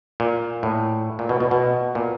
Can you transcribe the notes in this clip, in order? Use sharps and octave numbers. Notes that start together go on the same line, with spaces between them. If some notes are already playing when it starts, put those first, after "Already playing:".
A#2
A2
A#2
B2
B2
B2
A#2